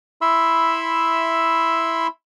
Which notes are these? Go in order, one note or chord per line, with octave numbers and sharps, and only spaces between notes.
E4 E5 B5 C6 E6